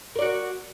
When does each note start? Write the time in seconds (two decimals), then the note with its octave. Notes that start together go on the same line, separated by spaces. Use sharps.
0.15 A#4
0.19 D5
0.22 F#4